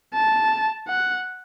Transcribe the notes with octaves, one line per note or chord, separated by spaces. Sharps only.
A5
F#5